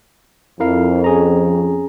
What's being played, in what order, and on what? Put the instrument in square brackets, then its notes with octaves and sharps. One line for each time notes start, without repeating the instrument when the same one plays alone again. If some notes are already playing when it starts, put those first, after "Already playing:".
[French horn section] F2 [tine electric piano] E4 A#4 F5
[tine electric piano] C#4 G#4 A#5